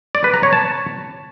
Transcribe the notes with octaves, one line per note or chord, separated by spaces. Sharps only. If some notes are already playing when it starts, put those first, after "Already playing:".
D5
B4
A#5
C#5
A5